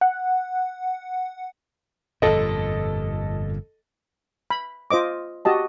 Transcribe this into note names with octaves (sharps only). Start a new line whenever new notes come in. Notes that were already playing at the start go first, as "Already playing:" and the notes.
F#5
G1 F2 A#2 A4 D#5
B5
F4 C5 D#5 D6
F#4 G4 D#5 A5